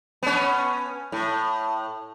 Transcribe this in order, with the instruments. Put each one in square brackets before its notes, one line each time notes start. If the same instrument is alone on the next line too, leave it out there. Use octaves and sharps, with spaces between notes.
[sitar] B3 C#4
A2